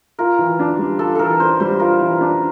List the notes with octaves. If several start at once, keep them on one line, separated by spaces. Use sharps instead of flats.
F4 A#4
E3
D4
G3
F4 A4
E3 A4 A#4
D4 C5
G3 C5
F4 A#4
E3
D4